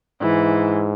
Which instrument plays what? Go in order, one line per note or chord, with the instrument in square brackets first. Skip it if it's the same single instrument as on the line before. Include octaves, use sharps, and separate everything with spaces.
[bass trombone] G#2 [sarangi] E3